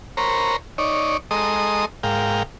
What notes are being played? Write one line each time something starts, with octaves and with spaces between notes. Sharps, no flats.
A#4 C5 C#5 A#5 B5
D#4 C#5 D5
G#3 A4 D#5 A#5 C6 D#6
G#2 A#4 F5 G5